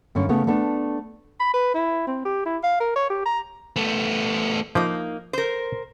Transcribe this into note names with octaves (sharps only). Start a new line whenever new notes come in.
G2 D3 C#4
C#3 A3 B3
A3 B3 D4
B5
B4
E4
C4
G4
E4
F5
A#4
C#5
G4
A#5
A3 B3
F3 A#3 D#4
A#4 C5